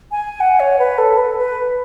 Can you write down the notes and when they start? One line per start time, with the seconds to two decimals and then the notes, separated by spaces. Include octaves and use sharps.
0.12 G#5
0.40 F#5
0.60 C#5
0.79 B4
0.98 A4
1.17 B4
1.37 B4